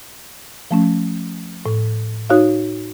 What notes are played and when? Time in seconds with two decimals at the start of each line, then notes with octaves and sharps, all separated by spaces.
0.71 F3 A3 C#4
1.66 A2
2.30 D#4 F#4 C#5 F5